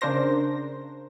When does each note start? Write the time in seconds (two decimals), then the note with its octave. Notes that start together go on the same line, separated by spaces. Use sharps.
0.01 C#3 D4 A#4 C5 A#6